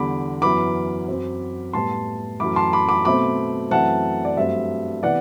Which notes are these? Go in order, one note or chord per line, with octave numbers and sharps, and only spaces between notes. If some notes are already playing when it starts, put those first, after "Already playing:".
Already playing: E2 D3 G3 B5 D6
F#2 E3 B3 B5 D6
F#2 F#3 C4
A2 G3 B3 A5 C6
F#2 E3 A3 B5 D6
A5 C6
B5 D6
B5 D6
B2 A3 C4 B5 D6
F#2 E3 A3 C4 F#5 A5
D5
G2 F#3 A3 C4 E5
C3 E3 B3 D5 F#5